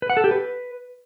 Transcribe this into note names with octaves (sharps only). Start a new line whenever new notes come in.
B4
F#5
A4
G4
B4